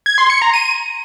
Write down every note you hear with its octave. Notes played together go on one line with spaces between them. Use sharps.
G#6
C6
C#7
A#5
D#7